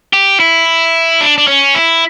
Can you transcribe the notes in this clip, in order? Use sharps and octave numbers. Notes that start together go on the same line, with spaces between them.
G4
E4
D4
D4
C#4
E4